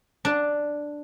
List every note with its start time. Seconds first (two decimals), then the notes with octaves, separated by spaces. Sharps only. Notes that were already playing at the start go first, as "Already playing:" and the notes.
0.25 D4